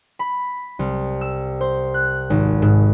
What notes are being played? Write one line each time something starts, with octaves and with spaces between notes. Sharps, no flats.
B5
C2
E6
C5
F#6
G#1
G#2